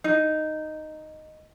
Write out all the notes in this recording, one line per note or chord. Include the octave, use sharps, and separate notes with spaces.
D#4